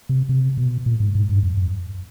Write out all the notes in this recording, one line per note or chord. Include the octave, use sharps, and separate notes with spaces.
C3
C3
B2
A#2
G#2
G#2
G2
F2
F#2